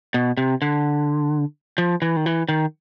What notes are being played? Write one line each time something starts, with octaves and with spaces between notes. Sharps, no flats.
B2
C3
D3
F3
E3
D#3
E3
D#3